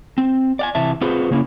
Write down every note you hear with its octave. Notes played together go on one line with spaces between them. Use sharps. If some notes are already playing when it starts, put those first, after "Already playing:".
C4
D5 F#5 G#5
C3 E3 E5 A5
C4 F4 F#4 G#4 B4 C5
C#3 A#3 C#4 D#4 E4